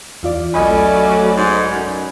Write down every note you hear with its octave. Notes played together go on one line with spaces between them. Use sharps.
E2 F4 D5
B1 F#3 A3 C#4 D5 D#5 B5
G#2
F#2